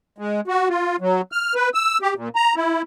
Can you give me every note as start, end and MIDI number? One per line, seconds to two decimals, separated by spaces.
0.18 0.41 56
0.48 0.69 66
0.69 0.96 65
1.00 1.21 54
1.32 1.54 89
1.55 1.69 71
1.74 1.98 88
2.02 2.14 67
2.16 2.29 46
2.36 2.55 82
2.56 2.82 64